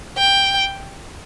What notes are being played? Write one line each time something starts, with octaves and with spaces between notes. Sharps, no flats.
G5